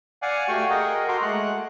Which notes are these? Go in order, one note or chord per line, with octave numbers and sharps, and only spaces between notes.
D5 F5 F#5 G#5
A3 F#4 G4 F5 G#5 C#6
G#4 A#4 D#5 F#5 G5
F#4 A4 A#5 C6 D6
G#3 A3 F#5 F#6